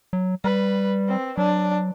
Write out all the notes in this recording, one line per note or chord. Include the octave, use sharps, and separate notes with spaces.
F#3
G3 B4
C4
F#3 D4